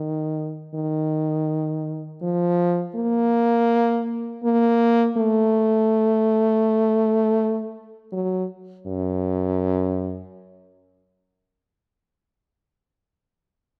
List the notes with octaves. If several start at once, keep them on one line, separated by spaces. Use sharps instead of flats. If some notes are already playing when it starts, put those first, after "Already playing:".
Already playing: D#3
D#3
F3
A#3
A#3
A3
F#3
F#2